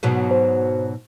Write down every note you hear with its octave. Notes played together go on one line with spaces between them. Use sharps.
G#2 B2 F#3
C5